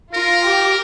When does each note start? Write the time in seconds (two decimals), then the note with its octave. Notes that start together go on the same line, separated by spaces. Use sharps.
0.14 F4 A#4
0.46 G4